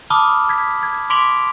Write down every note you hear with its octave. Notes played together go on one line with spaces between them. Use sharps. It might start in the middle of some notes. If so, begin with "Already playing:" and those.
A5 B5 D6 D#6 F6 G7
G#6 B6
G#6
C6 D6 B6 D7 F7 G7